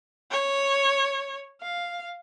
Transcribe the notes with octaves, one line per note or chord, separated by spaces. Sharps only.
C#5
F5